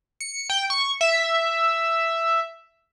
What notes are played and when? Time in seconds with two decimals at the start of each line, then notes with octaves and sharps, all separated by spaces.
0.21 C#7
0.50 G5
0.70 C#6
1.01 E5